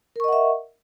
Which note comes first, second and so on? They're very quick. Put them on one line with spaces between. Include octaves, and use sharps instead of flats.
A#4 C#6 D#5 F#5 E5